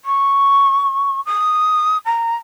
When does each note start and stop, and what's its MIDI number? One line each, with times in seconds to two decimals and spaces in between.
0.05 1.20 85
1.26 1.97 87
2.05 2.35 82